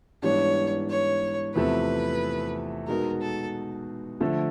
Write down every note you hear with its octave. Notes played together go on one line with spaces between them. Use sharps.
G#2 E3 G3 B3 D4 C#5
C#5
E2 C3 F3 A3 B4
B2 G#3 B3 D#4 F#4 A#4
A4
D3 F3 A3